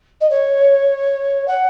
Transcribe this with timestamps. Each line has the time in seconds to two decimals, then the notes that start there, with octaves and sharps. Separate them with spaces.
0.20 D#5
0.30 C#5
1.47 F#5